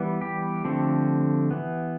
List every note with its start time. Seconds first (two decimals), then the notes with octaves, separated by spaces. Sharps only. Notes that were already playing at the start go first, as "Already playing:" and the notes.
Already playing: E3 G3 B3
0.21 G4
0.64 D3 F3 A3 C4
1.51 E3 B3